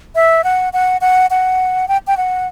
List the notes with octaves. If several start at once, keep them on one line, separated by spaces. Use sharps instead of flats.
E5
F#5
F#5
F#5
F#5
G5
G5
F#5